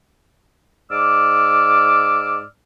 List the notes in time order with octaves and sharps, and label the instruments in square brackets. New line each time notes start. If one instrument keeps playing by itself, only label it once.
[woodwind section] G#2 D5 D6 E6 F6